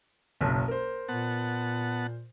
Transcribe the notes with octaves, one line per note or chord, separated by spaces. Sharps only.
F#1 B1
A#4 C5
A#2 B3 F#5 A5